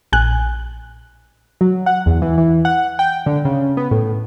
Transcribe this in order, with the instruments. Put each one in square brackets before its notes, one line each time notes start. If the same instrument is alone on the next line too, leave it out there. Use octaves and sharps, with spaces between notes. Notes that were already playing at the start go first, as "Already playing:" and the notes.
[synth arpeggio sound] A#1 G#5 F#6
[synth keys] F#3
F#5
E2
E3
E3
F#5
G5
D3
C#3
B3
A2